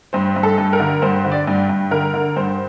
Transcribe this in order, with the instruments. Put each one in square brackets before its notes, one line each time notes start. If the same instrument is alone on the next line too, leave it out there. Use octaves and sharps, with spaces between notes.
[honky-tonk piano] G2 C5
G2
A4
G2
A#4
D3
G2 C5
D3
D5
G2
G2
D3 A#4
D3
G2 C5